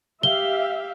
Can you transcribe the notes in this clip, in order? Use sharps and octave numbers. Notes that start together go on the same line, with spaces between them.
G4 E5 F5 G7